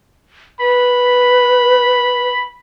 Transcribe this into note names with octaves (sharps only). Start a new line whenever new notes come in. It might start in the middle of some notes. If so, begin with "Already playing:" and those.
B4 B5